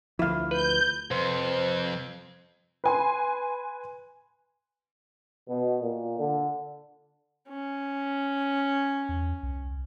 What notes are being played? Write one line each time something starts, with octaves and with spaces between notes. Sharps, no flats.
D2 F3 E4 F5
B4 G6
F2 C3 B4 C5 C6
B4 G#5 C6
B2
A#2
D3
C#4
E2
C2